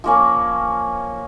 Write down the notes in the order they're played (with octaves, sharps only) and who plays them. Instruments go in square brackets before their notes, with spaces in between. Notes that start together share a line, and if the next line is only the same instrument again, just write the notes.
[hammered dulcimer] F3 A#3 C#4